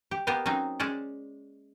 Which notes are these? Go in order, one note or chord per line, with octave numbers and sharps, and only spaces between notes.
G4
A#3 B3 G4 C5 D#5 F5
F#3 C4 C#4 D#4
G#3 C#4 C5 D5